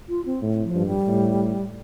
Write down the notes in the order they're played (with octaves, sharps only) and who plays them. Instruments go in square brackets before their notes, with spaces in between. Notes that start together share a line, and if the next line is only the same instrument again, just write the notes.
[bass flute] F4
C4
[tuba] A2
[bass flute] F3
[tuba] G2
[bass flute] G3
[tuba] A2